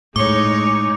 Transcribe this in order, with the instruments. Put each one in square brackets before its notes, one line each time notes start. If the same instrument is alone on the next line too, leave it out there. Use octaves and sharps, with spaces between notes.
[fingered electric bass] A2 [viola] G#3 D#4 [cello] C#5 [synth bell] D6